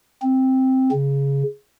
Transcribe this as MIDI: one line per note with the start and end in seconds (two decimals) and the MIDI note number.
0.22 0.90 60
0.92 1.43 49